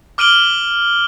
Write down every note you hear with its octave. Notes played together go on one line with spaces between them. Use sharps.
D6 F6 D7 D#7 F#7 G7